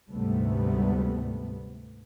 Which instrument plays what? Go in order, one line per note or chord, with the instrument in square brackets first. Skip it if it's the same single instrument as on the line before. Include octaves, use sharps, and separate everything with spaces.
[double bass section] D2 G#2 C3 G3 A3 B3